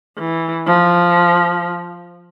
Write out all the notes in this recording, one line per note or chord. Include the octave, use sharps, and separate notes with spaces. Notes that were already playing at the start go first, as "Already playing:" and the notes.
E3
F3